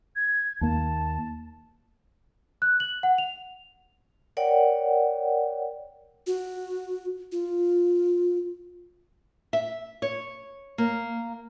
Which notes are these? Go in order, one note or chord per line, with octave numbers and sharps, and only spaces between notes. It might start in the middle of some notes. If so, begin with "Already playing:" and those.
G#6
D#2 A#3 A5
F#6
F#7
F#5
F7
A#4 C#5 D5 F#5 G5
F#4
F4
E5
C#5
A#3